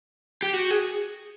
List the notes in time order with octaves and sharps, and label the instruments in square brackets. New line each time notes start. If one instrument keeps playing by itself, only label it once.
[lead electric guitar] G4
F#4
G#4